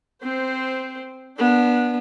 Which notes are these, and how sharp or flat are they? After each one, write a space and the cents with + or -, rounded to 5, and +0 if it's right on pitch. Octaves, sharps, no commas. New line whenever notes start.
C4 +0 C5 -10
B3 -20 D4 +0